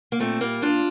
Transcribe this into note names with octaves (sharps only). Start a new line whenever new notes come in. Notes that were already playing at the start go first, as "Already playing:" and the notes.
A#3
A#2 A3 C4
A#2 G3 A#3
A#2 D4 F4